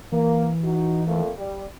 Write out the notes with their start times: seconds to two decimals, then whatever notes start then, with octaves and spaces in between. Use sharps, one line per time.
0.12 E3 A#3
0.64 D#4 F#4
1.06 F2 A3 A#3
1.36 G3